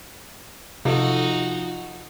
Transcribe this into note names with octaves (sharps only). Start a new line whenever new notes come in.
C3 F3 D#4 F4 F#4 A4